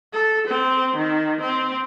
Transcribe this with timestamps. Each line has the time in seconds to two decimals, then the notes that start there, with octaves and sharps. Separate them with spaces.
0.13 A4
0.47 C4
0.96 D#3
1.41 C4